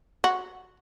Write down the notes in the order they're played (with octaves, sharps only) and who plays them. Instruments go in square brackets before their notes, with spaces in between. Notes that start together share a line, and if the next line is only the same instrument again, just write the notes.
[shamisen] F#4